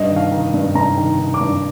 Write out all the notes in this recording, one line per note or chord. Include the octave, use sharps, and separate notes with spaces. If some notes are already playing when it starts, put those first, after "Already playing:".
Already playing: G2 D#5
D#3
F5
D#3
G2
G2 A#5
D#3
D#3
D6
G2